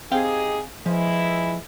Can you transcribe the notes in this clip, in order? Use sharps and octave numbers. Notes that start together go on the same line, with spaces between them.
C4 D#4 G4 G#4 F5 G5
E3 F3 G#3 E4